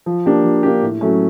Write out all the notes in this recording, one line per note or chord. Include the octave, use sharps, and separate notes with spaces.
F3
A#3 D4 G4
F3
A#3 D4 G4
A2
F#3 A3 C#4